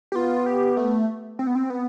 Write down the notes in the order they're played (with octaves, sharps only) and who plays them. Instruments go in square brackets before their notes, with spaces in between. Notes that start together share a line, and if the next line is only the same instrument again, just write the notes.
[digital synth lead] G4
[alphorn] B3 [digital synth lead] F4
[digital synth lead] G4
A3
C4
B3
C4
B3